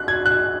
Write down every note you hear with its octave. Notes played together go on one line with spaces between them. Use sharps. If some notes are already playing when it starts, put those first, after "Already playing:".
Already playing: F#6
G#6
F#6